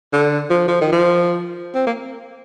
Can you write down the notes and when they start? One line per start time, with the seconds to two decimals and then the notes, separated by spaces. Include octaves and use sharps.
0.13 D3
0.50 F3
0.68 F3
0.81 D#3
0.92 F3
1.74 C4
1.87 A#3